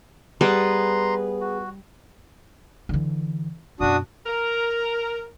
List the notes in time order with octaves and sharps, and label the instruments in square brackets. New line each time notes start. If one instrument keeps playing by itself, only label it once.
[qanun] G3 [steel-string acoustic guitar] B3 G#4 B4 [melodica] A#5 C6
[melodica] F#4
[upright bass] D3 E3
[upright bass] F#2 B2 [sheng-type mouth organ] D4 F#4 D#6
[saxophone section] A#4